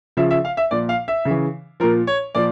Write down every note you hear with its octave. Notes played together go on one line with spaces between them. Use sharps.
C#3 F3 E5
E5
F5
E5
A#2 F3 D5
F5
E5
C#3 E3
A#2 F3 A#4
C#5
A#2 F3 D5